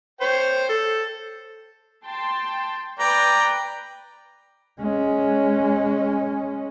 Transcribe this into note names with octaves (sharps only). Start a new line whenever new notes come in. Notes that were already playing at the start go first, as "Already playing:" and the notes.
C5 C#5 G5
A4
G5 A5 C6
B4 D5 G5 A#5
G#3 C#4